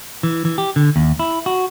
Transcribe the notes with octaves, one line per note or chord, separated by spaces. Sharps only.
E3
E3
G4
D3
D#2
E4
F#4